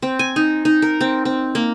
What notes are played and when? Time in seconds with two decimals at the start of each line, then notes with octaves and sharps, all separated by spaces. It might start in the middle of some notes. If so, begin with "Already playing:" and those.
0.02 C4
0.19 G#5
0.36 D#4
0.65 D#4
0.82 A#4
1.01 C4
1.25 C4
1.55 A#3